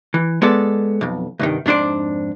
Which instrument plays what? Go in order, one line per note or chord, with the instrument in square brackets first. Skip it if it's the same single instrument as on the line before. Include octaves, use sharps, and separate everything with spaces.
[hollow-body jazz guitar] E3
G#3 B3 A4 D5
B1 F2
C2 G2 D#3
F2 G#2 D4 C5 D5